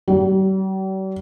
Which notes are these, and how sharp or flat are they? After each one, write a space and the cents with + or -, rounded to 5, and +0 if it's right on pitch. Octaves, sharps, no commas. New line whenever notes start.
G3 -45